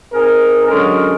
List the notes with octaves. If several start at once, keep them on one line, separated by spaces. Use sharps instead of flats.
C4 D#4 G#4 A#4
D3 F#3 G#3 C#4 A4 A#4